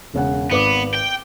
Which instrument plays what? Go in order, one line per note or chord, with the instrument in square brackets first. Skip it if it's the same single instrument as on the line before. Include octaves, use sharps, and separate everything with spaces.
[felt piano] E1 C#3 F#5
[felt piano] G#1 B4 D6 [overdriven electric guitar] B3
[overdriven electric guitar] G5